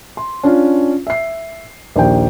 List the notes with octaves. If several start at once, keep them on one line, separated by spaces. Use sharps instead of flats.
C6
C#4 D4 F4
E5 C7
A#1 D#2 G5